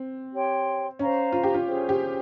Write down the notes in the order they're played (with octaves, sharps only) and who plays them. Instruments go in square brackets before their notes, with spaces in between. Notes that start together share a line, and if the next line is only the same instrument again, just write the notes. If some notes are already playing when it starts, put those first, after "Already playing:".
Already playing: [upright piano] C4
[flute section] G4 C#5 G5 C6
[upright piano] C#4 [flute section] C5 F5 A#5
[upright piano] F4
G4
F4
[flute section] C#4 G#4 C5
[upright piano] G4